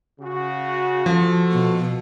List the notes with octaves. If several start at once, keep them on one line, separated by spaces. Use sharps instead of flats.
C#3 F#4
F3 F#4 A4
B2